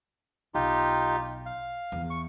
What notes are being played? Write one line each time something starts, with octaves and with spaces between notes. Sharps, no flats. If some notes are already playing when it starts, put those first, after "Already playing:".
B1 D#4 F4 G4
F5
E2
C#6